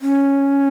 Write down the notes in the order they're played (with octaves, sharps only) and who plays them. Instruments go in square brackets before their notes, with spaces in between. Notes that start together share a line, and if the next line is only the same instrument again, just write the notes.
[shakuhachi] C#4